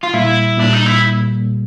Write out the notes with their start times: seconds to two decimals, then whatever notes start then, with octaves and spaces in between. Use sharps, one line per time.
0.03 F4
0.13 A#2 G3 A#3 E4
0.57 A#2 G3 A#3 D4
0.73 D#4
0.86 E4